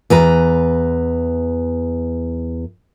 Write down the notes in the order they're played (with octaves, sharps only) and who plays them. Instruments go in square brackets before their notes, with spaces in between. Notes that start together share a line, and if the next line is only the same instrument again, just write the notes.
[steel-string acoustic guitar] E2 B4 A#5